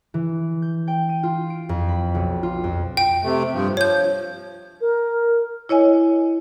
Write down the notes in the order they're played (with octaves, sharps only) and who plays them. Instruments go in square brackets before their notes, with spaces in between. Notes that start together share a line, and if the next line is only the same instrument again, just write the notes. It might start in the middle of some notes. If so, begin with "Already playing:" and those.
[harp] E3
G6
G5
D#7
F4
D7
F2
B5
B1
F4
F2
[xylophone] G5
[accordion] C3 A3
G2 F3
[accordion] F3 [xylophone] C#5 G6
[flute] A#4
[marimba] E4 C#5 D#5 G#5